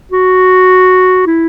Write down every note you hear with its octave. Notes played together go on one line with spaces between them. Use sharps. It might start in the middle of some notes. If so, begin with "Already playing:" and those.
F#4
E4